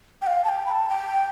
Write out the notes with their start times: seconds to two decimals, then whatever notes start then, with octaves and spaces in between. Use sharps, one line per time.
0.22 G5
0.27 F5
0.44 A5
0.49 G5
0.66 B5
0.71 A5
0.89 G5